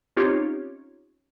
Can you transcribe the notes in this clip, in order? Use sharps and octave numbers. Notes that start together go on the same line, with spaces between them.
C4 C#4 D#4 F4 G4 C#5